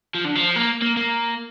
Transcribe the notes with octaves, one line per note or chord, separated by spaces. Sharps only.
F3
D3
F3
A#3
A#3
A#3